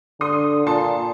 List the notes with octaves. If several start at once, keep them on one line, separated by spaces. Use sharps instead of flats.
D3 C6 D#6
A#2 A5 C6